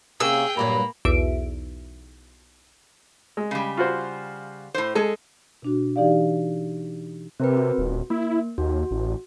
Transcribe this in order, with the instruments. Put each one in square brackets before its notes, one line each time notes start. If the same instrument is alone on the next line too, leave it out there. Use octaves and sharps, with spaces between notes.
[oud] C3 A#3 C#4 [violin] G#4 G5 [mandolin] E6
[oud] G2 A#2 F#3 [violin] A#3 [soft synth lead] B5
[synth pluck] B1 E2 E5 D7
[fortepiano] G#3
[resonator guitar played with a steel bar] C#3 G3
[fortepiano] F4 F#4 C5
[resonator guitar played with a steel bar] A2 C5
[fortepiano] G#3 [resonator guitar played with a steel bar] G#4 A4
[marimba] B2 D4 F#4
E3 D#4 G4 D5 F5
[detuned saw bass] C3 [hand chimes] C4 A#4 B4
[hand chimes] F#4
[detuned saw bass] D#1
[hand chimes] A#3 [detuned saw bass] E4
[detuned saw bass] D#2 [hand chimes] F#4
[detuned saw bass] A1